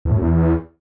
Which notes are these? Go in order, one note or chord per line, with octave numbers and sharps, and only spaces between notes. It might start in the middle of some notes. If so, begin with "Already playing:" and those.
E2
A2
F#2
E2